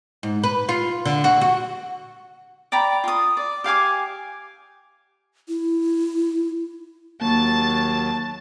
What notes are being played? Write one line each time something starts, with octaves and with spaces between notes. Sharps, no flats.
G#2
B4
F4
D3
F#4
F#4
D5 G5 A#5 B5
F4 D#6
D5
G4 F5 G#5 D6
E4
D#2 F#3 A#3 A5 A6